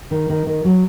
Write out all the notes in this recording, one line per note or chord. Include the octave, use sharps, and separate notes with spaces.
D#3
D#3
D#3
F#3